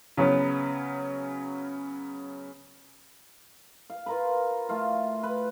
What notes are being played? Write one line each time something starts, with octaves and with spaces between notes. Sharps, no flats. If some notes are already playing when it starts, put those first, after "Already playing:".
C#3 F#3 B3 C#4
F5
F4 A#4 B4
A3 F4 F5
B4